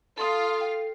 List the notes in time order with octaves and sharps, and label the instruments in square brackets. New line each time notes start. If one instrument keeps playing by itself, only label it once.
[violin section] F4 F5 [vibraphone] A4 [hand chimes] A5 C6 D#6
[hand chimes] G5 C7